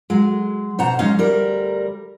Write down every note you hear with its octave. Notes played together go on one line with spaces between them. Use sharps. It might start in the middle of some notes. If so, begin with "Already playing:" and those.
F#3 G#3
B2 C5 F#5 A#5
F#3 G#3 C#4 D#4 F5
D2 G3 A#4